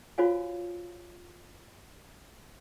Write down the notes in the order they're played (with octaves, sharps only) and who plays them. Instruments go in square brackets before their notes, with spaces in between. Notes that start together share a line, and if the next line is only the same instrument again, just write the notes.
[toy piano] F4 F#4 C5 C#5 F5 G#5